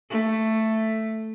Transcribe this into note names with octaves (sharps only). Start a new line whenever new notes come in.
A3